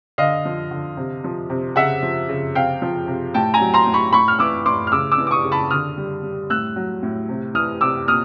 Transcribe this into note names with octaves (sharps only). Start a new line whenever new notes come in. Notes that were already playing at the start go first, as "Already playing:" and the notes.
D3 D#5 F5
F3
D3
C3
F3
C3
C#3 E5 F#5
F3
C#3
C3 F5 G5
F3
C3
A2 G5 A5
G#5 A#5
F#3
A#5 C6
A2
B5 C#6
A2 B5 C#6
F6
E3 D6 E6
A2 C6 D6
F6
C#3 D6 E6
D6 E6
E3
D6
C#6 D#6
C#3
A5 B5
D3 D#6 F6
G3
G3
A2 E6 F#6
F#3
A2
C3
E3 D#6 F6
C3 D6 E6
A#2 D#6 F6